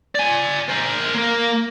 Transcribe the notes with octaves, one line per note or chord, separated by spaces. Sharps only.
D5 G#5
A#4 C5
A#3 A#4